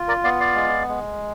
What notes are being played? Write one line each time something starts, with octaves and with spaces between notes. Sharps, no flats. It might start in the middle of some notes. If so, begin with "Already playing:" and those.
Already playing: F4
A#4 D5
B3 D5 F5
D5 F5
G#3
G#3